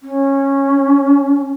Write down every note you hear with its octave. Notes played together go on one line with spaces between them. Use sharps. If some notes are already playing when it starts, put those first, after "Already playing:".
C#4